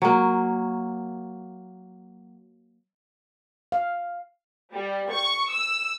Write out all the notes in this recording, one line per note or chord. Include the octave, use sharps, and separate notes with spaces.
F#3 A#3
F5
G3
C#6
E6